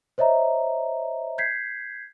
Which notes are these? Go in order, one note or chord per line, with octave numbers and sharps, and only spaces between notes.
C5 C#5 D#5 E5 A#5
G6 G#6 B6 C7